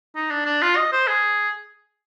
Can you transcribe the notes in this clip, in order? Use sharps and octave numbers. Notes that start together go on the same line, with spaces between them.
D#4
D4
D4
F4
D#5
C5
G#4